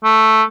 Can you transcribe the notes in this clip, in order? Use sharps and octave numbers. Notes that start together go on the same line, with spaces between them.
A3